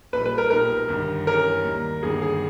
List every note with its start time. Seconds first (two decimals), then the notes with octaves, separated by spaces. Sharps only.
0.13 A#1 A#2 G3 B4
0.26 B4
0.38 A#4
0.50 B1 A#2 G#3 D#4 G4 A#4
0.88 G1 G2 D#3
1.27 G2 E3 G#3 C#4 A#4
1.65 D#2 D#3 G3 A#3
2.03 G1 G2 D#3 A#3 G#4
2.22 G#4